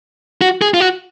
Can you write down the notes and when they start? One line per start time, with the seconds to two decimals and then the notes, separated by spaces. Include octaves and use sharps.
0.41 F#4
0.62 G#4
0.74 F4
0.80 F#4